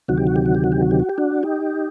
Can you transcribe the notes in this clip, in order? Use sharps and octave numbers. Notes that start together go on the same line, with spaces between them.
D2 C3 D#3 F#3 F#4
G4
F#4
G4
F#4
G4
F#4
G4
F#4
G4
F#4
G4
D4 F#4
D#4 G4